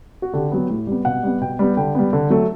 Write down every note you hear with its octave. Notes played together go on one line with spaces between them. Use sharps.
F#4
D3 G4
F#3 B3
A2
G3 B3
B2 F#5
G3 B3
B2 G5
G3 B3
D3 G5
G3 B3
D3
F#3 A3